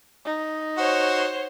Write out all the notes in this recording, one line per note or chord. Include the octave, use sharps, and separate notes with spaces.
D#4
F#4 C5 C#5